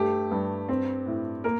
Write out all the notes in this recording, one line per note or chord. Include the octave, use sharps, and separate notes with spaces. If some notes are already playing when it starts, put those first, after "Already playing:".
Already playing: G2 A3 G4
G2
C4
A2
A#3 A#4